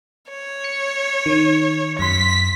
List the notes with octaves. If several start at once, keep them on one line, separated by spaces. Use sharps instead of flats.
C#5
C#7
D#3
F#2 C6 B6